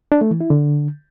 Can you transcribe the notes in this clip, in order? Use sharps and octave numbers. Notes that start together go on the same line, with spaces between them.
D4
A3
E3
E4
D3